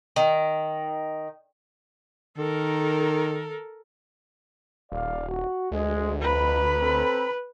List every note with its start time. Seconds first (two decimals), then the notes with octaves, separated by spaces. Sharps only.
0.16 D#3
2.38 D#3 A4 A#4
4.92 D#1 D5 F5
5.28 F#4
5.72 D2 G#3
6.21 F2 B4 A#5 B5
6.80 C4 A4